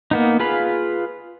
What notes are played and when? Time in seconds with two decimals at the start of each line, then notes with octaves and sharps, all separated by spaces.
0.11 A#3 B3 D#4
0.40 F4 G#4 B4 F5 B5